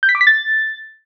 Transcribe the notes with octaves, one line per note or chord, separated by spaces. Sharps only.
G6
B6
D6
B6
A6